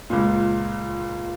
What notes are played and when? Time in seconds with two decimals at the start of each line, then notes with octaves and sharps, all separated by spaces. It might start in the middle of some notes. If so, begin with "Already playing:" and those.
0.10 C#2 A#2